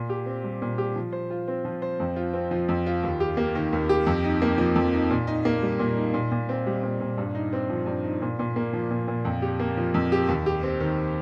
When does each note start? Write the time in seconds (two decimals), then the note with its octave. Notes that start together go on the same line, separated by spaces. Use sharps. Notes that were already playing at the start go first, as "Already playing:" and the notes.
Already playing: A#2
0.09 G4
0.26 C4
0.44 G3
0.62 A#2
0.78 G4
0.96 F3
1.12 C5
1.30 F4
1.48 C4
1.65 F3
1.82 C5
2.00 F2
2.16 F4
2.33 C4
2.51 F3
2.69 F2
2.86 F4
3.03 D#2
3.20 G4
3.37 A#3
3.55 D#3
3.73 D#2
3.89 G4
4.07 F2
4.24 D#4
4.42 A#3
4.58 F3
4.76 F2
4.93 D#4
5.10 A#2
5.27 D#4
5.45 A#3
5.62 G3
5.79 A#2
5.97 D#4
6.14 A#2
6.32 A#2
6.49 C4
6.66 G3
6.83 A#2
7.00 A#2
7.18 G2
7.35 D#4
7.53 C4
7.69 F3
7.86 G2
8.04 D#4
8.22 A#2
8.39 A#2
8.56 A#3
8.73 F3
8.91 A#2
9.08 A#2
9.25 F2
9.42 G4
9.60 A#3
9.77 F3
9.94 F2
10.12 G4
10.28 D#2
10.46 G4
10.63 C4
10.80 D#3